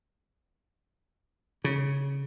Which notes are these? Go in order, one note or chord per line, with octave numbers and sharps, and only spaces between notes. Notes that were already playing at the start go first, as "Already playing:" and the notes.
C#3